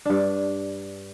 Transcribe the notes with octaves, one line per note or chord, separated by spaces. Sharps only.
G2 D4